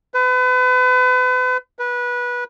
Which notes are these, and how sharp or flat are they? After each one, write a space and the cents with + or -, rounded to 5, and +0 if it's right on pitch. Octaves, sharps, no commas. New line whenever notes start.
B4 +35
B4 -20